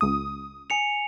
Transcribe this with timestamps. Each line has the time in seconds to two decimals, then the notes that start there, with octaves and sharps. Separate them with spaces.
0.01 C#2 D#6
0.70 G#5 C#7 F7